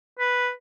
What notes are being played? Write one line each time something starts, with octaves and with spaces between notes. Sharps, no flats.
B4